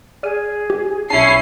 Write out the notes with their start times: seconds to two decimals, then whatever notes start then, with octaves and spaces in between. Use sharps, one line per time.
0.23 G#4 D5 F6 D#7
0.70 G4
1.10 B1 C#4 E4 A5 C7